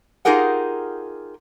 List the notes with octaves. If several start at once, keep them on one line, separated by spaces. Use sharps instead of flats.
D#4 F4 G4 G#4 A#4 F#5